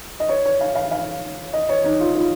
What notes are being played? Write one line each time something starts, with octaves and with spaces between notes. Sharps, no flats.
D#5
C#5
C#5
F5
F5
F5
D#5
C#5
D#4
F4
F4